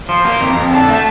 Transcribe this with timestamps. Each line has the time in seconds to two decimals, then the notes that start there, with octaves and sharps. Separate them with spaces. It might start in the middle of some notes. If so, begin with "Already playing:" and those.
0.09 F3 C6
0.25 A#3
0.41 F2 A#5
0.56 F2
0.72 D3 A5
0.88 A3